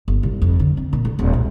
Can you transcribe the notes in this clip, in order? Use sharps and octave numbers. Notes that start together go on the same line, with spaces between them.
G1
C2
F2
D3
C4
A#2
D1
D#1
B1